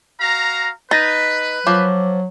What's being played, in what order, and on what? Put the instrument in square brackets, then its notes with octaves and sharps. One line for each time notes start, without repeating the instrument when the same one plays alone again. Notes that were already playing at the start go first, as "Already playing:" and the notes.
[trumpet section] F#4 F5 A#5
[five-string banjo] D#4 [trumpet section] B4 [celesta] A6 A#6 D#7
[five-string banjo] F3 [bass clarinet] F#3 [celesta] D6